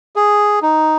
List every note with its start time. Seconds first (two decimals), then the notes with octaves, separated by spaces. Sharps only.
0.16 G#4
0.62 D#4